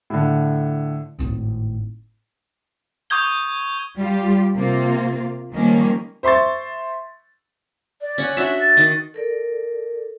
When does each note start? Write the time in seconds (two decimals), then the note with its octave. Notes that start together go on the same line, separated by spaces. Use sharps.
0.10 A2 D3
1.19 G#1 A2
3.10 C#6 D#6 G6 G#6 G7
3.98 G3 F4 G4
4.54 C3 A#3 F4
5.54 D#3 F3 G3 A#3 C#4
6.23 C5 E5 C6 C#6 A6
8.01 D5
8.18 C#4 F#5
8.37 D4 F#4 E5
8.61 A6
8.77 D#3 D#5
9.14 A4 A#4 D5